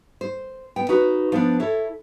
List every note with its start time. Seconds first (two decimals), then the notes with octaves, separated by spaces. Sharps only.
0.21 C5
0.76 B3 G5
0.89 D#4 F#4 B4
1.32 F3 B3 D4
1.60 E4 A4 C#5